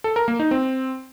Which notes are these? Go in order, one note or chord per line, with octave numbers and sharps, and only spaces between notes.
A4
A#4
A#3
D#4
C4